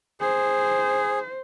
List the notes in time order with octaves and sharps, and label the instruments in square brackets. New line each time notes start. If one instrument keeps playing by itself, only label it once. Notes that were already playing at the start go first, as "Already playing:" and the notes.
[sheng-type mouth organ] G#4 [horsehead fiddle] C5